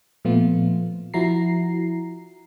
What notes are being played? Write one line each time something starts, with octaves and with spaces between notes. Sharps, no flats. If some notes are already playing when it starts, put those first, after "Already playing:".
A#2 F3 A3 B3 F4
F3 E4 F#4 A#5 C7